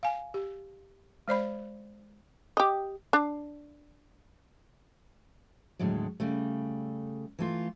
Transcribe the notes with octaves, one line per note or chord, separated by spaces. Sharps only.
F5 G#5
G4
G#3 C5 D5 B5
G4 D#5
D4
D#2 A2 D3 F#3 G#3
C#3 G3 A3
E3 A3 F4